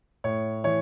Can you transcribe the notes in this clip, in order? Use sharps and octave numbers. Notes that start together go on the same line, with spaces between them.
A2 C#5
E3 C#5